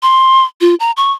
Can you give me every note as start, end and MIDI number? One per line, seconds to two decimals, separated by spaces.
0.03 0.44 84
0.61 0.75 65
0.80 0.91 82
0.97 1.11 85